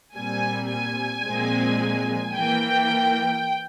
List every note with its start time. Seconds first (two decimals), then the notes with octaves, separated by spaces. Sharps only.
0.15 A#2 G3 C4 G#5
0.69 G#5
1.24 A#2 F3 G#3 C4
2.34 E3 A#3 G5